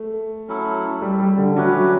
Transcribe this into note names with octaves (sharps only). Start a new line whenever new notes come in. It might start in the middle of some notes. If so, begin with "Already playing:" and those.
Already playing: A3
F#3 C#4 E4 A4
G3
G3
D3
F#3 A3 C#4 G4 B4